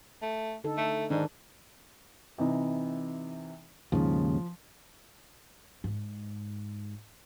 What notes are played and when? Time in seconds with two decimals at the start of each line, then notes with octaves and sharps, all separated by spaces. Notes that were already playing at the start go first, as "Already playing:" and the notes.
0.22 A3
0.64 D3 D#4 A4
0.77 A3
1.10 G#2 D#3 D4
2.38 C3 E3 D#4
3.92 D#2 G#2 C#3 F3
5.84 G#2